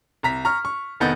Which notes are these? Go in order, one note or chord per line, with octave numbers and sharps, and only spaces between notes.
C2 A#5 B6
A#5 C#6 F6
C#6
F1 D#3 B3 G6 A6